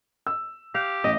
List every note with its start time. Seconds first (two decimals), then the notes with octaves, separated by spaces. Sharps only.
0.27 E6
0.75 G4 F5
1.04 A1 D#5